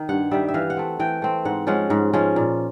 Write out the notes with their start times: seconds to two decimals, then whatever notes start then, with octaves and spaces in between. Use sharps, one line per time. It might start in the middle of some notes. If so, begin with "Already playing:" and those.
Already playing: D#3
0.09 G2 F#5
0.31 D#3 G3 E5
0.48 E5
0.54 E3 F5
0.70 F#5
0.77 A3 C4
1.00 E3 G5
1.22 A3 C4
1.45 G#2 F#5
1.67 F3 G#3 C#4 F#5
1.90 G#2
2.13 F3 G#3 C#4
2.36 A#2